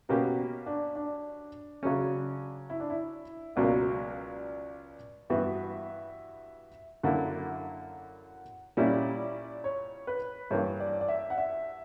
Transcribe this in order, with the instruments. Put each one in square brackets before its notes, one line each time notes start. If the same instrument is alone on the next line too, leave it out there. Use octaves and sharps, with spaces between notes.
[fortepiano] B2 A#3 C#4 G4 [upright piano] B3
[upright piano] D4
D4
[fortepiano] C#3 F#3 C#4
[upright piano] E4
D4
E4
[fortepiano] C#2 B2 F#3 A#3 [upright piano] D5
[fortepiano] G2 E3 B3 F#4 [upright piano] E5
[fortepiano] F#2 D3 A#3 E4 [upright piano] F#5
[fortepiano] A#2 G3 C#4 E4 [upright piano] D5
[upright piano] C#5
B4
[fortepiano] G2 E3 A#3 [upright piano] C#5
[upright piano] D5
D5
E5
F#5
E5